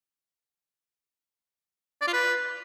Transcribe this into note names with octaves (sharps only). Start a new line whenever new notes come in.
D5
F4
B4